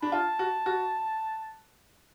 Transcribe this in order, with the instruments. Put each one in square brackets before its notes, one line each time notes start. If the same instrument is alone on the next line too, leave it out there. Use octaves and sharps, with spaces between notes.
[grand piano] D4 [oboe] B5
[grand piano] F4 [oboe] A5
[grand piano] F#4
F#4